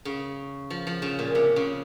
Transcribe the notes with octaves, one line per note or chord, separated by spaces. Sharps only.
C#3
F3
F3
C#3
A#2
C3
C#3